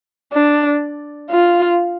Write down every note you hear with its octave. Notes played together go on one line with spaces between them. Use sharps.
D4
F4